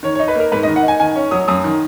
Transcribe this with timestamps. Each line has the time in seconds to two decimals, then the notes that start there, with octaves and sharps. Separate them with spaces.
0.03 D#3 C#5
0.15 C#5
0.20 D#4
0.28 B4
0.35 A#3 A#4
0.52 G#2 B4
0.63 D#5
0.67 D#3
0.76 F#5
0.83 D#4 G#5
1.00 D#3 G#5
1.16 C#4
1.31 F#3 D#6
1.48 F#2 D#6
1.64 D#3